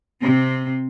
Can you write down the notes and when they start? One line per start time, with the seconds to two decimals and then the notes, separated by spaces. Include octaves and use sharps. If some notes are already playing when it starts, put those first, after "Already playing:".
0.21 C3 C4